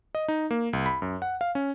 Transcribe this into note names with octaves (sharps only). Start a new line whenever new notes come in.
D#5
D#4
A#3
C2
B5
F#2
F#5
F5
C#4